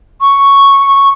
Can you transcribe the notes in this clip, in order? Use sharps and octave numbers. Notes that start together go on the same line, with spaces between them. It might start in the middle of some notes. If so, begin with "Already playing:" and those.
C#6